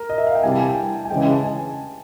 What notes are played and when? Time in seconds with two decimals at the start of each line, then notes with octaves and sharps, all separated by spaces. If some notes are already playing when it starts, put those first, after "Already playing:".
Already playing: A#4
0.10 D#5
0.18 E5
0.27 F5
0.35 G5
0.43 C3 E3 G3 G#5
0.52 A5
0.60 G#5
0.68 G5
1.05 G#5
1.10 C#3 E3 G#3 G5
1.21 G#5
1.32 A5
1.44 G#5